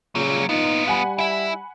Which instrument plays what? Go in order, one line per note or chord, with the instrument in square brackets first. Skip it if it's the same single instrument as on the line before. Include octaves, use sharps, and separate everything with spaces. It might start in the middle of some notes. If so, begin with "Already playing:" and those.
[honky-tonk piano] A#2 [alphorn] C#3 [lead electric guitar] F#3 G3
[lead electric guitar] B3 F4 [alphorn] D#4
[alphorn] G3 [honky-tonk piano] F#5 G#5 B5
[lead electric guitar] E4 E5